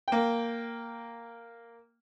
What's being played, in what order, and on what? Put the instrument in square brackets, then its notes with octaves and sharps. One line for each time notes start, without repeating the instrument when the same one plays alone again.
[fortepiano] A#3 G5